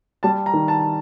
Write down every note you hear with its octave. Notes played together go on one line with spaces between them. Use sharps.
G3 A5
A#5
D#3
A5